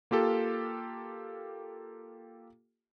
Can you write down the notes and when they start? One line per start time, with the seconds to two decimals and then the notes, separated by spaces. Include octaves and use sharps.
0.11 A#3 F4 G4 A4